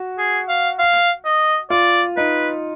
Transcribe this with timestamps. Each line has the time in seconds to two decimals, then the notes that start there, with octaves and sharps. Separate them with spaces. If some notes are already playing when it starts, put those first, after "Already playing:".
Already playing: F#4
0.18 G#4
0.48 F5
0.79 F5
1.25 D#5
1.70 F4 D5
2.17 D#4 B4